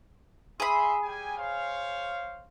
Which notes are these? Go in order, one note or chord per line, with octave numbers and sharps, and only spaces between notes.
G#4 E5 B5 C6
G3 G5 G#5
C5 C#5 F5